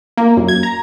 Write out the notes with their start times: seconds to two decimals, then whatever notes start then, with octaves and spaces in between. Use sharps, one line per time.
0.17 A#3
0.37 F#2
0.48 G#6
0.63 A#5